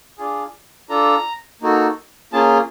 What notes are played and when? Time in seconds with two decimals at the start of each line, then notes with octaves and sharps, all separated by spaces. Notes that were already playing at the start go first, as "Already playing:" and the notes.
0.18 D4 F4 G#4
0.89 D4 F4 A4 A#5
1.62 A#3 D#4 F#4 A4
2.33 A#3 C#4 F4 G#4 A5